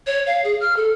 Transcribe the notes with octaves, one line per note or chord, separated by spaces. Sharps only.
C#5
F5
G#4
F6
A4